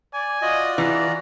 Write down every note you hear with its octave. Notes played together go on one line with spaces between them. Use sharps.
D5 G#5
F4 F#4 D5 D#5
E3 G#4 A#5